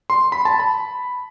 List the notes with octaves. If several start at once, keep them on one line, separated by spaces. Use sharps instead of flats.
C6
B5
A5
B5